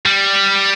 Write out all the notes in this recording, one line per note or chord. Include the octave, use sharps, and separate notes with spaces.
G3